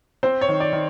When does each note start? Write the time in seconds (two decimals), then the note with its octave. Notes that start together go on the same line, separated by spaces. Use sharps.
0.23 C4 C5
0.41 C#5
0.48 D#3
0.60 D5
0.73 D#3